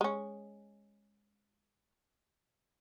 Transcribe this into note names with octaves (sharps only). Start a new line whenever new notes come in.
G#3 C#4